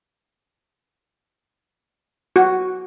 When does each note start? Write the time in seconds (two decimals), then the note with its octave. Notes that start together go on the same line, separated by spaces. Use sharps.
2.36 F#4